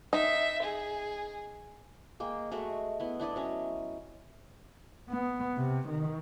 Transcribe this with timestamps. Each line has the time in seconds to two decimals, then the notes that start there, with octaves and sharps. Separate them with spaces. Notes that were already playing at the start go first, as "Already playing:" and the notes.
0.13 D#4 E5
0.63 G#4
2.20 G#3 A#3 G5
2.52 G#3 A3 F#4
3.00 B3 E4
3.20 D4 E4 D5 D#5
3.36 F#3 C#4
5.09 B3
5.58 C3
5.88 D#3